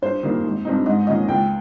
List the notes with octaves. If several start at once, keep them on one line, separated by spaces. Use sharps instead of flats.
G2 C5
D#3 G3 A#3
G#1
G2 G3 C4 D#4
G#2 D#5
D#3 A#3 C#4 D#5
C#2 G5